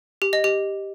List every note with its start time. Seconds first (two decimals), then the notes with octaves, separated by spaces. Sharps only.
0.22 G4
0.33 D#5
0.44 G4